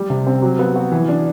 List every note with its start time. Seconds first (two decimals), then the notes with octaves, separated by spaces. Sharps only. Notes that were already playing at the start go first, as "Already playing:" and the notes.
Already playing: G3
0.10 C3
0.27 C4
0.42 F#3
0.59 B3
0.76 F#4
0.92 E3
1.09 D4